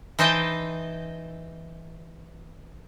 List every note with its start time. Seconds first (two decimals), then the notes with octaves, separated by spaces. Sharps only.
0.19 E3 D#4 C5 D#5 G5 A5